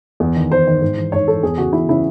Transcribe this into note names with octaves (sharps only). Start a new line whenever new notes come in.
E2
D#3
E2 C5
D#3
G#2
E3
G#2 C#5
E3 A4
E2 G#4
C#3 E3 F#4
E2 E4
C#3 E3 E4